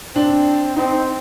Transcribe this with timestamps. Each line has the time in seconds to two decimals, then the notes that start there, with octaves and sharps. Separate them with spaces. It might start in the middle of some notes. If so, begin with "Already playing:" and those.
0.16 C4 D4
0.76 C4 D#4